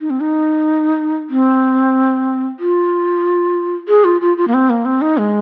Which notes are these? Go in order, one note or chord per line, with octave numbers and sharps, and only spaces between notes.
D#4
C4
D#4
C4
F4
G#4
F4
F4
F4
A#3
C4
A#3
C4
D#4
G#3